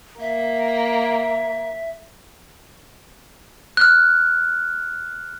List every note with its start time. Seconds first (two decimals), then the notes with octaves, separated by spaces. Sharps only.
0.21 A#3 E5
3.77 F6 F#6